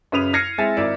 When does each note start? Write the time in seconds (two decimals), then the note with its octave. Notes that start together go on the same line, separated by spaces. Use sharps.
0.12 F#2 C#3 B4 D#6 D#7 F7
0.33 F6 G#6 A#6 C7 C#7 D#7
0.58 G#3 C4 E4 E5 G#5 A6
0.77 G#1 E4 A#4 D5 E5